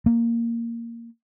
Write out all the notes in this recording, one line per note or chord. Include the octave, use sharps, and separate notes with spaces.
A#3